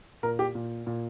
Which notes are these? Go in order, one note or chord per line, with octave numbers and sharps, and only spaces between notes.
A#2 A#4
G4
A#2
A#2